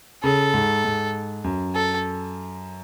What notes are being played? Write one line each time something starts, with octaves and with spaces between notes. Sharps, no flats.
C#3 A4
G#2
G#2
F#2
A4